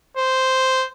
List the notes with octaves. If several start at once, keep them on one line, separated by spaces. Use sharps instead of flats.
C5